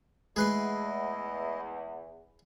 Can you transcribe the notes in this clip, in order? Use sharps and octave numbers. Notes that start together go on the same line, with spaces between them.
E2 G#3 A3 E4 G#4 B4 D#5 C6